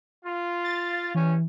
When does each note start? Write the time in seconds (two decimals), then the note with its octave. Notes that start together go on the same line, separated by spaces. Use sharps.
0.25 F4
0.64 A6
1.15 G2 E3 C#4